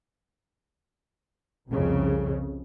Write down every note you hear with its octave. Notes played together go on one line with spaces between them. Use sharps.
C2 F2 C#3